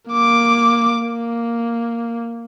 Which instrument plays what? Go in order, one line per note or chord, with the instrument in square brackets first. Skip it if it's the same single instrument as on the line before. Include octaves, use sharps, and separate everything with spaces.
[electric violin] A#3 D6
A#3